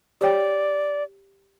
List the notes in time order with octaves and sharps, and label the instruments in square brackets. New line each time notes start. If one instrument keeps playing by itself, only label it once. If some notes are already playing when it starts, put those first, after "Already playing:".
[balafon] G4 C#5 G5 [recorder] D5